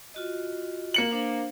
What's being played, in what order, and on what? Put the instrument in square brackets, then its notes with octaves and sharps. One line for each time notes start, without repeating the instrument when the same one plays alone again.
[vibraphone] F4 F#4 D#5
[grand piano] A#3 C#7 F#7
[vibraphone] D4 C5 F5